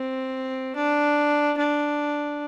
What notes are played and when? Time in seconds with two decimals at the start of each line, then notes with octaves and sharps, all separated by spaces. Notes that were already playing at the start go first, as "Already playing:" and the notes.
Already playing: C4
0.76 D4
1.57 D4